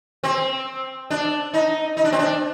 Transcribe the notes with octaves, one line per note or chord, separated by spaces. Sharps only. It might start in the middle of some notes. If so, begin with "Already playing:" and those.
C4
D4
D#4
D#4
D4
C4
D4